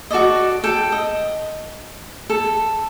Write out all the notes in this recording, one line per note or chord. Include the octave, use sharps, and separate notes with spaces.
F#4 A4 D5 D#5
A4 G5
D#5
A4